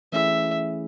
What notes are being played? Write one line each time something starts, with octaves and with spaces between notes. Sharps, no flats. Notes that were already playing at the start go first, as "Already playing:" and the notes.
E3 A3 C#4 E4 G#4 E5